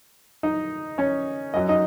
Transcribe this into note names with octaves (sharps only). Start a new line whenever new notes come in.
D#4 D#5
C#4 C#5
F#2 F#3 D#5
D#4 D#5